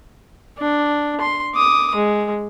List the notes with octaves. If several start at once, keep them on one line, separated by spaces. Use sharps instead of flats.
D4
C6
D6 D#6
G#3